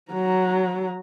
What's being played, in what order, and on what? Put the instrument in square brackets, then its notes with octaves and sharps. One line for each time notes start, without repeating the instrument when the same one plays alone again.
[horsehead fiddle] F#3 A#5